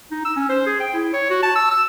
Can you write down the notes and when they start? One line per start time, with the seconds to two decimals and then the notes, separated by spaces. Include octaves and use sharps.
0.11 D#4
0.25 E6
0.36 C#4
0.49 C5
0.66 G#4
0.80 G5
0.93 E4
1.13 C#5
1.30 F#4
1.43 A5
1.55 E6
1.71 E6